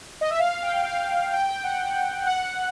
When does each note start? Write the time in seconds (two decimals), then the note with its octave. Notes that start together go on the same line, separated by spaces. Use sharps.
0.21 D#5
0.30 E5
0.39 F5
0.63 G5
0.86 F5
1.33 G5
1.49 G5
1.64 F#5
2.26 F#5